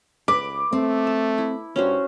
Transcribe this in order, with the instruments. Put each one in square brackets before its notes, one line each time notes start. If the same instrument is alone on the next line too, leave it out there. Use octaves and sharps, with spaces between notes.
[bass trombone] C#2 [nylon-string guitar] B4 [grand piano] D6
[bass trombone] A3 [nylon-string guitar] C4
[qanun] A5
E4
[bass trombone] G2 [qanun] C#4 F#4 C5